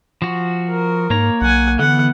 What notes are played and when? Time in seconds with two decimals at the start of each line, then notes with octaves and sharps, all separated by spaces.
0.22 F3 F#4
0.70 A#4
1.10 G#2 A#3 C#5 A#5
1.41 B1 F#5 G#5
1.79 D3 E3 B3 F#5